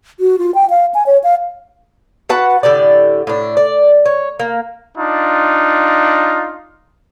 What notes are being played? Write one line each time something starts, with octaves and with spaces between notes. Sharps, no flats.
F#4
F4
G5
F5
G#5
C#5
F5
F#4 B4 F#5 A5
A2 D3 G4 D5
A2 D4
D5
C#5
A#3
D4 D#4 F4